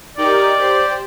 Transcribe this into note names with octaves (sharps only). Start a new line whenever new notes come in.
D#4 G4 A#4 D5
G4 C5